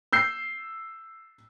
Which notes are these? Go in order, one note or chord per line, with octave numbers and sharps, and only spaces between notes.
E6 G6 C7